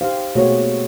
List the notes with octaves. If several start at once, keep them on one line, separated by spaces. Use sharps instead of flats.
D#4 G4 C5 F5
B2 A3 A#3 F#4 G#4 C#5